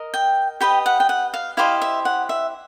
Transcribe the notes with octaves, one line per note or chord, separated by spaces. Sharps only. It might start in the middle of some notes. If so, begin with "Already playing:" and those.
Already playing: A#4 D#5
G5
G4 B4 D#5 G5
F#5
G5
F#5
F5
E4 G4 C5 D#5 F5
E5
F#5
E5